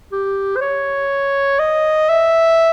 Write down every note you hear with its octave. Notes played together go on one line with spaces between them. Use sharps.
G4
C5
C#5
D#5
E5